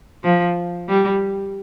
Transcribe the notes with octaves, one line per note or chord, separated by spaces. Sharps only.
F3
G3